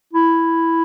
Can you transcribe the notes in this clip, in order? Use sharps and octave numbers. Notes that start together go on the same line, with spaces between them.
E4